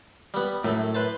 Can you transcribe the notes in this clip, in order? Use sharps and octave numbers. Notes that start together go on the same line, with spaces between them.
G3 B3
F#2 A2 A3
B4 C5 A5